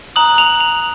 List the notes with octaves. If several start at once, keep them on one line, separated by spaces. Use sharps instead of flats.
A#5 D#6 F#6 F#7
F7
F7